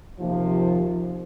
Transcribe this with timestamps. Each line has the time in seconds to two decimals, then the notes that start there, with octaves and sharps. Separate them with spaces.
0.20 D#2 C3 F3